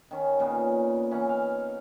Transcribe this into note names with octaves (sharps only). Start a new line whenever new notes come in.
D#3 C#4
A#2 C#3 A#3 B3
E3 C#4 D#4 F#5
F5